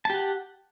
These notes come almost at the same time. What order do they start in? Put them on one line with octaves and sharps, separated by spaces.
A5 G4 F#5